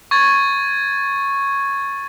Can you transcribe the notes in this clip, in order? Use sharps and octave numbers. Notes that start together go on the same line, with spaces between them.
C#6 G#6 A6